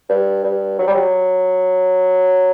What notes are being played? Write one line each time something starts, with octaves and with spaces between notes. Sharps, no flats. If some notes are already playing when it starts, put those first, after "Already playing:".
G2
G2
F#3
G3
F#3